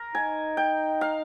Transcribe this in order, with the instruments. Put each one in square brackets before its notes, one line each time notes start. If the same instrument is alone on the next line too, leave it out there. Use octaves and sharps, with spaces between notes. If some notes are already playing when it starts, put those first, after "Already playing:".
Already playing: [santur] A#4
[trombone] D#4 [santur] G#5
[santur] G5
F5